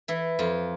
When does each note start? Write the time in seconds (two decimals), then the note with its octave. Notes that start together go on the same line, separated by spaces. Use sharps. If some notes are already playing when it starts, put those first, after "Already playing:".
0.08 E3 E4
0.39 F2 F4